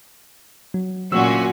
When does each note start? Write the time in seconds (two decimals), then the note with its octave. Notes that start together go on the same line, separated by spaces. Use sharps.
0.74 F#3
1.12 D2 A#2 F#3 C#4 F#4 E6